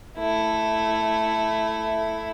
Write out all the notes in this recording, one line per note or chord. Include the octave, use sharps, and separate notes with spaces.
A3 E4